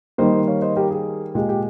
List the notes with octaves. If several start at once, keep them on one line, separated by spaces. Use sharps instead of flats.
D#3 G3 A#3 C5 D#5
C#5 F5
C5 D#5
G4 A#4
G#4
A#2 G#3 G4
G4